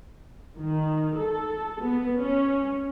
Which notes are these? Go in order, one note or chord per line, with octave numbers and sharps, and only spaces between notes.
D#3
A4
B3
C#4